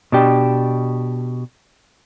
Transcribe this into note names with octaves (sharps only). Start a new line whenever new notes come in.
B2 D4 G4